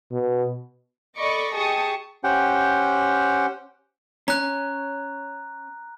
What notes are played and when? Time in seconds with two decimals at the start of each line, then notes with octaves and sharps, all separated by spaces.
0.11 B2
1.17 A4 D5 D#5 B5 C#6 D6
1.54 G4 G#4 A5 C#6 D#6
2.24 C#4 G4 C5 F#5 G5
4.28 C#4 A#5 F#6